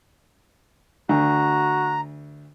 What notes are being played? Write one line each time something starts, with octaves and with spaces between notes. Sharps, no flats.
D2 F#4 A#5